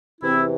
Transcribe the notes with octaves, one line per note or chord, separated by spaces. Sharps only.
E2 C3 E3 C4 E4